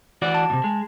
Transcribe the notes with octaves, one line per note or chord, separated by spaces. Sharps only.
E3 F#4 D5
A5
D#2 C3
G#3